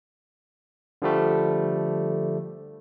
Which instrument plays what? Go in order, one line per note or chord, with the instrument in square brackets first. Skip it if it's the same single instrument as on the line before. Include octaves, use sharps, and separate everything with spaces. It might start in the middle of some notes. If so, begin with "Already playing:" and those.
[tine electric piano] D3 F3 G3 A3